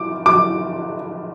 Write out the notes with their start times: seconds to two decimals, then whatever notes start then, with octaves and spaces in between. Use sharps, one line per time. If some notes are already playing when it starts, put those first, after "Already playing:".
Already playing: D6
0.26 D6